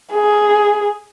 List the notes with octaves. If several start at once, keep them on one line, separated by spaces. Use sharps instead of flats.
G#4